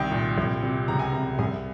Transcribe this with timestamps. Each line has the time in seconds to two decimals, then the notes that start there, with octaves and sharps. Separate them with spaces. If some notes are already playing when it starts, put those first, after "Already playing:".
Already playing: C2 D#3 G5
0.12 A#2
0.38 C2
0.63 C3
0.88 C#2 A#5
0.99 G#5
1.12 C3 A#5
1.38 C2 G#5